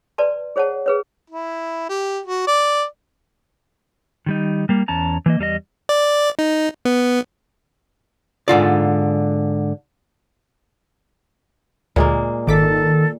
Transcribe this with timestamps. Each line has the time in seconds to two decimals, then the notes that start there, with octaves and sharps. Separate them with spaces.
0.18 B4 D5 A5 C6
0.56 G#4 C5 C#5 F#5 A5
0.86 G#4 B4 C#5
1.30 E4
1.89 G4
2.25 F#4
2.47 D5
4.26 D#3 G3 D#4
4.69 G3 A#3
4.88 E2 C#4 A5 A#5
5.26 E3 A#3 D#5
5.39 E2 G3 D4 D#5
5.89 D5
6.39 D#4
6.85 B3
8.48 G#2 D3 F4 D5
11.96 D2 A#2 G#3 A#3
12.47 G#1 D#3 A4 D6 B6